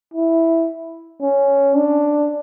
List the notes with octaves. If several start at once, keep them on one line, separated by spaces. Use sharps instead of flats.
E4
C#4
D4